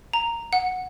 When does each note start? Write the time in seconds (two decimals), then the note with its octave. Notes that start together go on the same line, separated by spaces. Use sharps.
0.13 A#5
0.53 F#5